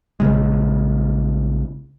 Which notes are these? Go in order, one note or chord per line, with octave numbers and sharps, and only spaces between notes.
A#1 C#3 G#3